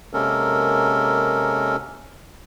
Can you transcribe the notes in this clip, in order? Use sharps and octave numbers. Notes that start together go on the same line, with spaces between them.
C3 G#3 A#3 C#4 A4 A#4